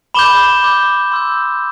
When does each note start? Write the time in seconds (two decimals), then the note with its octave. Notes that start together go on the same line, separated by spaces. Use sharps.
0.14 B5 D6 G6 E7 G7
0.63 B5 D6 G6
1.12 C6 E6 G6